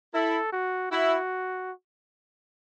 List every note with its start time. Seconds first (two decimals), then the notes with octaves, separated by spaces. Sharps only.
0.14 E4 A4
0.52 F#4
0.91 E4 F#4